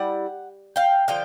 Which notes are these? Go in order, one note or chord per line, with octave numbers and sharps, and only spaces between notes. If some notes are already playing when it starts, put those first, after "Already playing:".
Already playing: G3 E4 F#5
F5 G5
D3 F3 F5 G5